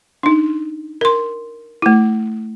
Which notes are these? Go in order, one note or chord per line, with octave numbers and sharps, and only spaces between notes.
D4 D#4
A#4 C6
A3 E4